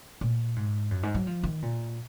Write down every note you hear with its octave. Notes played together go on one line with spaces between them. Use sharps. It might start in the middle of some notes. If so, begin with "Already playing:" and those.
A#2
G#2
F#2
G#2
F#3
F3
D#3
A#2